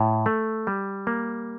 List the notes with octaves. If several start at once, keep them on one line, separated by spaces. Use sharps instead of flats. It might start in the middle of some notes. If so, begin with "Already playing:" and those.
Already playing: A2
A3
G3
A#3